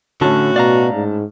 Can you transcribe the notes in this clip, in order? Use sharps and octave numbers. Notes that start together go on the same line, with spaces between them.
A2 D3 C#4 F#4 A5
B2 D5 F5 A#5
G#2